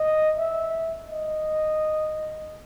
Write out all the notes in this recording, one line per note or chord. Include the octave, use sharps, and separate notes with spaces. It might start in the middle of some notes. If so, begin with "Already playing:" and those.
Already playing: D#5
E5
D#5